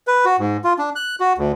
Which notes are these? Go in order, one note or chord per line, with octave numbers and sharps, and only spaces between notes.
B4
F#4
G#2
F4
D4
F#6
F#4
D2